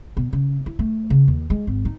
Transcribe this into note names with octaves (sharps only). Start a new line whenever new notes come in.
B2
C#3
E4
A3
C#3
D#2
G#3
G#1
D#4